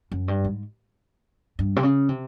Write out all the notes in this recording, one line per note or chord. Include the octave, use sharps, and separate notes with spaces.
F#2
G2
G#2
G2
C3
C#3
C3